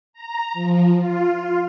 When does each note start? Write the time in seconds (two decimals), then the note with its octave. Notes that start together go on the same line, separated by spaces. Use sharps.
0.13 A#5
0.54 F3
0.97 F4